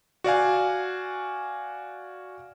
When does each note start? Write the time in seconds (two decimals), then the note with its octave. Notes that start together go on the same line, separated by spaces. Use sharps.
0.24 F#4 D5 F5 G#5